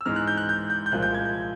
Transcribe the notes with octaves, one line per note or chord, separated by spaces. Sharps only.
E6
G#2 E3 G#3 F6
F#6
G6
F#6
G6
G6
G6
C2 A#2 F3 G#3 F#6
G6
G#6
G6